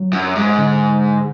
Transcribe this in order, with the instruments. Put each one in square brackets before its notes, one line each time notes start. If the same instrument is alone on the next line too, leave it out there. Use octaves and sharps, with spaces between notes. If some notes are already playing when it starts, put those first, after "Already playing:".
Already playing: [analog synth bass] F#3
[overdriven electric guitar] F#2
G#2
[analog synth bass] D3